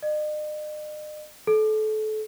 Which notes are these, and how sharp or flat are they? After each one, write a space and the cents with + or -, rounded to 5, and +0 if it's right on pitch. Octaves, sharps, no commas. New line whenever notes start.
D#5 -45
A4 -30